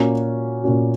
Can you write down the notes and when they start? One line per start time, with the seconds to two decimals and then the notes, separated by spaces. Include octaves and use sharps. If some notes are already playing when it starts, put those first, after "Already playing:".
Already playing: A#2 A#3 C#4 F#4
0.64 A#2 A#3 C#4 F#4